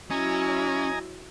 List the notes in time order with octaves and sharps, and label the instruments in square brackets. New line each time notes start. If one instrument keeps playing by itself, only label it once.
[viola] F#3 E4 [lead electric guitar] C#4 [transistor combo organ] D#5 G#5 A#5